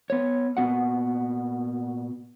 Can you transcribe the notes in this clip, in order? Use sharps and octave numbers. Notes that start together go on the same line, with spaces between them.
B3 C#5
A#2 B3 F#4 F#5